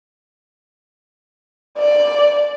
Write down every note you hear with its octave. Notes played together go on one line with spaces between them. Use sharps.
D5